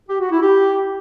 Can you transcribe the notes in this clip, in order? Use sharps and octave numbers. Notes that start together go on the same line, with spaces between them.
G4
F#4
E4
G4